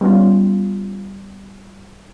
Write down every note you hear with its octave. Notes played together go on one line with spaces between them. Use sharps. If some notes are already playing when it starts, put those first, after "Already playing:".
G3 B3 C#4 F4